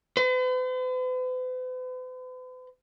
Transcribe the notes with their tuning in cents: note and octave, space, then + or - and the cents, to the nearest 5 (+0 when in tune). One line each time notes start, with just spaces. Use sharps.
B4 +45